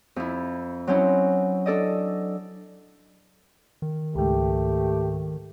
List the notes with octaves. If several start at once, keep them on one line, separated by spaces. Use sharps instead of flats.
F2 E4
F#3 C4 C#4 D#4 E4
D4 A4 D5 D#5
D#3
C#2 G#2 A3 G4